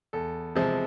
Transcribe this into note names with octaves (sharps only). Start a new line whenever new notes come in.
E2 A4
C3 F3 G#3